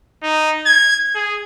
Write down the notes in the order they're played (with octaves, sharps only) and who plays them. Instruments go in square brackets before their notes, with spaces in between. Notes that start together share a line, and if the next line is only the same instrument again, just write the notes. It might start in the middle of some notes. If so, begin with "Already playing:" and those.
[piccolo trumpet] D#4
G#6
G#4